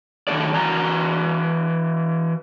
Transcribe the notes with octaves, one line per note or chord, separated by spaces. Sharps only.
D#3 F3 F#3 A4 D5
E3 F#4 G#5 A#5